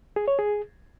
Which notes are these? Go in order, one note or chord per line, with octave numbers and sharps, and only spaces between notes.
G#4
C#5
G#4